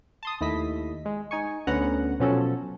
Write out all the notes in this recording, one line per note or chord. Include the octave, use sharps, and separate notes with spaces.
A5 C6 D#6
D#2 A3 E4 D#5 B6
G#3
D#4 G#5 C#6
D2 D3 B3 C#4 F#5 A#5
B2 F3 F#3 C#4 F#4 A4